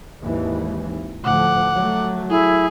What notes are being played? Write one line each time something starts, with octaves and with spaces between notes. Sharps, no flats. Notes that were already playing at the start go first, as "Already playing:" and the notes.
G#1 D#2 E3
D2 A2 F3 F#5 D6
F#3 A3
E4 G#4